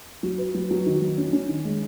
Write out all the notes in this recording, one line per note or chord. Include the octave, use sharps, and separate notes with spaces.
F#3
B4
F#3
F#3
D#3
F#3
C#4
C#4
D#3
G#3